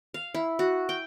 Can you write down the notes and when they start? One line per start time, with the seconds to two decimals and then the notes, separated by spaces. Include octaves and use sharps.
0.14 F5
0.34 E4
0.59 F#4
0.89 G5